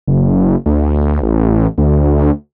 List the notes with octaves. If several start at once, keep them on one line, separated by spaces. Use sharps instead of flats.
F#1
D2
A1
D2